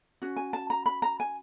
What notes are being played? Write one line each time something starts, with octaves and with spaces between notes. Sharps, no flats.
C#4 F#4
G#5
A5
A#5
B5
A#5
G#5